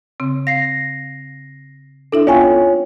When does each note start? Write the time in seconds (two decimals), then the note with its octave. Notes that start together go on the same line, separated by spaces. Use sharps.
0.20 C#3 C4
0.47 F5 A#6 C7
2.12 D4 E4 A4 E5
2.27 B3 C#4 F4 F5 G5 G#5